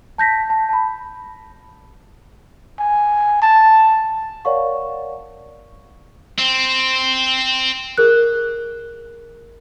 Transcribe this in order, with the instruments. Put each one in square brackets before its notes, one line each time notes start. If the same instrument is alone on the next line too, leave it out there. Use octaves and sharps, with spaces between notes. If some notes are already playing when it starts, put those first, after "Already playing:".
[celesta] A5 G6 A#6 B6
A5
A5 B5
[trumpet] G#5
A5
[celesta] A#4 C#5 D5 F5 F#5 C#6
[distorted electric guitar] C4
[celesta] G#4 A#4 F#6